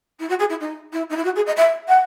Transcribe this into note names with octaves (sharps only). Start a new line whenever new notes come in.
E4
F#4
G#4
E4
D#4
E4
D#4
E4
F#4
G#4
D#5
E5
F#5